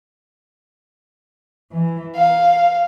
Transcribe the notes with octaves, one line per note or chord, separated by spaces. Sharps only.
E3
F5